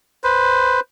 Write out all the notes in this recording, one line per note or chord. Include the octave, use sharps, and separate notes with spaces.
B4 C5